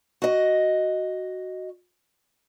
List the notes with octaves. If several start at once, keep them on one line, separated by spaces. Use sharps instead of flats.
F#4 D#5